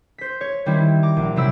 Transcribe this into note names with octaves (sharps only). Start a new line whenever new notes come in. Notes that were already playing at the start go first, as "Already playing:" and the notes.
C5 B6
C#5
D#3 G3 C4 E4
A#5 D6
A#1
C3 F#3 G3 E4 E6 D7